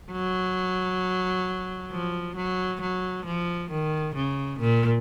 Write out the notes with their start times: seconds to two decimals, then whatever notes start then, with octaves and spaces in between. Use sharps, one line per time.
0.12 F#3
1.91 F3
2.36 F#3
2.81 F#3
3.26 F3
3.71 D#3
4.15 C#3
4.60 A#2